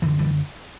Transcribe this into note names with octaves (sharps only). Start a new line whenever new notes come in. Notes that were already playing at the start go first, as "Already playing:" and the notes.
F#2 D3 E3
E3 G3